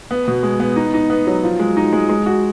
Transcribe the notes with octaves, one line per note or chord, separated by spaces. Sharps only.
B3
B2
G#3
B3
D#4
D#4
B3
F#3
F3
G#3
D#4
G#3
G#3
F#4